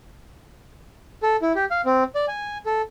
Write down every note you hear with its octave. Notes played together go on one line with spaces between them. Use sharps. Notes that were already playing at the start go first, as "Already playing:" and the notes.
A4
E4
G4
F5
C4
D5
G#5
A4